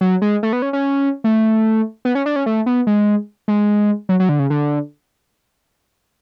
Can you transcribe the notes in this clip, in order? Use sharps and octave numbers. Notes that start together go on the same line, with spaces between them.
F#3
G#3
A3
B3
C#4
C#4
A3
B3
C#4
D4
C#4
A3
B3
G#3
G#3
F#3
F#3
D3
C#3
D3